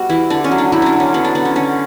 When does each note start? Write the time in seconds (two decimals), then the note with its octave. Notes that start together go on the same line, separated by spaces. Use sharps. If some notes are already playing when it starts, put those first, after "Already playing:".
Already playing: G3 B3 F#4
0.09 E3 E4
0.30 D3 D4
0.44 C#4
0.51 F#3
0.58 D4
0.72 F#3 E4
0.82 C#4 D4
0.93 D3
1.00 C#4
1.14 F#3 B3
1.25 D4
1.35 D3 B3
1.45 C#4
1.55 D3 C#4